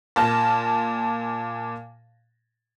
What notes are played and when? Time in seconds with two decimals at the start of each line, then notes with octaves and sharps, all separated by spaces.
0.16 A#2 A5 F6 A#6